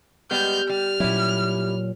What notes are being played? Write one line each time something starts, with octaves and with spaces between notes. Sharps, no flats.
G3 G#3 B3 G4 F6 G6
G3 F6
A#2 F#3 G3 C#4 E4